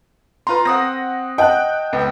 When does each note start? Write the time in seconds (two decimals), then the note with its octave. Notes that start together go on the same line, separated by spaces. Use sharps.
0.47 F4 B4 A#5 C6
0.65 C4 F#5 D#6 A#6
1.38 D#5 F#5 G5 A5 F#6
1.93 C#2 B3